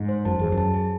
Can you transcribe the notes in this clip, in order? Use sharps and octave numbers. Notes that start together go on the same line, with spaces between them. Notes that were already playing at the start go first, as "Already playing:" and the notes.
Already playing: G#2
C5
F#2 A5
E2 G#4
F#2
A5
G#4